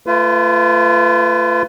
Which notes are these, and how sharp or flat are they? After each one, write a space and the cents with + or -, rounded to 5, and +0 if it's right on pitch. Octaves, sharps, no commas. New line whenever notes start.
A3 +15 F4 -20 B4 +30